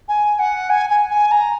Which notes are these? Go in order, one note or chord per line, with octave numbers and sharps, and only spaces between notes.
G#5
F#5
G#5
G#5
G#5
A#5